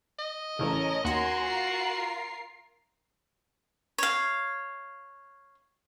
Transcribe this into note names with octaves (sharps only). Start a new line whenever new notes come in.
D#5
A1 A2 C#3 C#4 A4 A#4
D#2 F#4 A#4 F#5 G#5 C6 A#6
F4 A#4 C7
C#5 F5